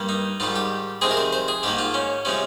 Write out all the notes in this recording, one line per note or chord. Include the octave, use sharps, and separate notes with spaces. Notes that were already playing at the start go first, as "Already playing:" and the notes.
Already playing: G2 G3 A#3
D#4
G#2 D#3 G3 F4
G4
F2 C3 D#3 G#3 C4 G#4
A#4
C5
C5
G#4
G#2 D#3 A#3 G4
F4
C#4
C3 F3 G#3 C4 C#4